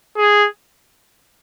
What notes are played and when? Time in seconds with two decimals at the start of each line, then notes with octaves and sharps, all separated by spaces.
0.18 G#4